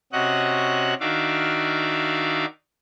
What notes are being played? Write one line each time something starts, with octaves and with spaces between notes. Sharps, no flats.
C3 C#4 F#4 D#5 F#5 F#6
D#3 D4 F#4 E5 F5 D6